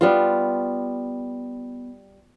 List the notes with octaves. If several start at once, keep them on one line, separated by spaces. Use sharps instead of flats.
G3 B3 F4